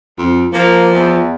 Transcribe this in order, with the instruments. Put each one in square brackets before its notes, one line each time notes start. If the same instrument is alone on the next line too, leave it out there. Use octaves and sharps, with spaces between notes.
[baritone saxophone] F2
[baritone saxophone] F3 [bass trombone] A#3
[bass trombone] E2